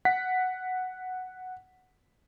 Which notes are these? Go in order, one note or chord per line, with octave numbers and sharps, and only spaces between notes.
F#5 B6